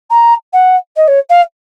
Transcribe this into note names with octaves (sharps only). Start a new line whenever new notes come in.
A#5
F#5
D#5
C#5
F5